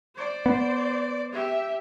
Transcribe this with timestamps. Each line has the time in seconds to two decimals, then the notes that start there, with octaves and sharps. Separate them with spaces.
0.16 C5 D5
0.46 B3
1.33 G4 E5